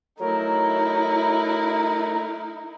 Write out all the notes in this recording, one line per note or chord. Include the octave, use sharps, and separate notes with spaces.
F#3 A3 D#4 E4 A#4